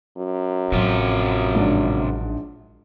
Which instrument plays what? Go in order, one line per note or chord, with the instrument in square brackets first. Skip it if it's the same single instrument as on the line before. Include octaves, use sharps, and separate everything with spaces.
[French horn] F#2
[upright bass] A1 F#3 [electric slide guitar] C3 F4 G4
[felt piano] A#1 G#2 D4